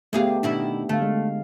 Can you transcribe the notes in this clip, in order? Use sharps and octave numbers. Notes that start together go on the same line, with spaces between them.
D2 A3 B3 G4 G#4 F5
B2 D#3 D4 E4
D3 A3 F5
G#3